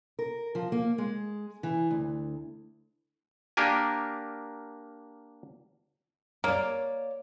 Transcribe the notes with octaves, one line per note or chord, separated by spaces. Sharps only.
A#4
F3
A#3
G#3
E3
D2
A#3 D4 G4 A#4 G#5
A#3 C#5 D5